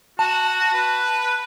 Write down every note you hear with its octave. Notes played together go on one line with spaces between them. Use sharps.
F#4 A5
B4